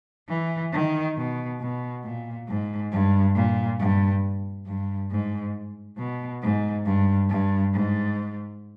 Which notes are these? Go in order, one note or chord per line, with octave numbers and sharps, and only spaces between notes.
E3
D#3
B2
B2
A#2
G#2
G2
A#2
G2
G2
G#2
B2
G#2
G2
G2
G#2